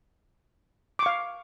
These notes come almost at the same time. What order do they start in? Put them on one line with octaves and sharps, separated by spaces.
D6 C#6 F5